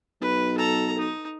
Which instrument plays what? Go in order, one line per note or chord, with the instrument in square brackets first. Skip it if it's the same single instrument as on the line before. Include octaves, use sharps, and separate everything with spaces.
[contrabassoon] B1 [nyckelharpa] B4
[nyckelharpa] A4 A#5
D#4